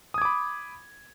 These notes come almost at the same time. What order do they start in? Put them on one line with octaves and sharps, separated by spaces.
D#6 G#6 D6 B5